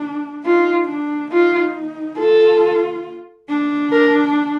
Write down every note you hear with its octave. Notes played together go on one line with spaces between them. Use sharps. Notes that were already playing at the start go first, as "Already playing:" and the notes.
Already playing: D4
D#4 F4
D4
D#4 F4
F4 A4
D4
A#4